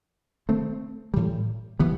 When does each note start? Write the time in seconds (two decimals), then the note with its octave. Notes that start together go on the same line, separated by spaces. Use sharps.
0.49 D#3 A3 C4
1.14 A2 E3 G3
1.79 E3 G3 B3